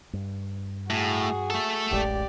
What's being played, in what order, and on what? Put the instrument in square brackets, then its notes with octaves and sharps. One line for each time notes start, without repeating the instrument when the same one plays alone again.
[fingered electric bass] G2
[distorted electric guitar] A2 [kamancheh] F#4 G#4
[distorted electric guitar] A3 A4
[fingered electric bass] D1 A1 G#3 [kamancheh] G4 D5